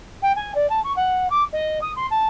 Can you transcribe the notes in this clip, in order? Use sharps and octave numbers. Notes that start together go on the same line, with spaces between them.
G5
G#5
D5
A5
C#6
F#5
D6
D#5
D#6
C6
A5